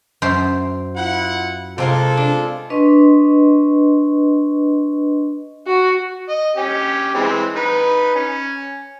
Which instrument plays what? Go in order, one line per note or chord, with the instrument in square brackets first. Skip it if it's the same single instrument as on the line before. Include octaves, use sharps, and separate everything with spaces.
[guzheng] F#2 C5 E5
[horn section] E4 F4 F#5
[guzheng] C3 C4 A#4 [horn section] G#3 F4 A4
[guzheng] D4
[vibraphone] D4 B4 D#5 C6 C#6
[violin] F#4
[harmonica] D#5
C#4 G4
E3 G#3 C4
D#4 B4
C#4